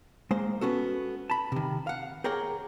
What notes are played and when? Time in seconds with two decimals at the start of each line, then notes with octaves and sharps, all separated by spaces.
0.31 G#3 A#3 C5
0.61 B3 C#4 F#4 A4
1.30 A5 B5
1.52 C3 D#3
1.87 F5 F#5
2.24 G4 G#4 A#4 C#5 G5